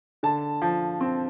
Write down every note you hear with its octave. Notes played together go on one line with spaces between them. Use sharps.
D3 A5
F3
C4